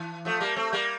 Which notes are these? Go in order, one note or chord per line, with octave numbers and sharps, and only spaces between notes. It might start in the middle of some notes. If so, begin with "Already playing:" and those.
Already playing: E3
F3 A3
G3 A#3
A3 C4
G3 A#3